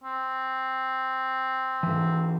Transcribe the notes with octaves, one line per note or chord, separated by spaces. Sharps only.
C4
G#2 E3